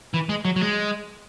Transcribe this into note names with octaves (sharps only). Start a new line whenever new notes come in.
E3
G#3
F#3
F#3
G#3